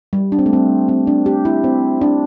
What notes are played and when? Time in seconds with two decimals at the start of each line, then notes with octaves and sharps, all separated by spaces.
0.13 G3
0.32 D4
0.39 C4
0.46 A3
0.53 C4
0.88 C4
1.07 D4
1.26 G4
1.45 E4
1.64 C4
2.01 D4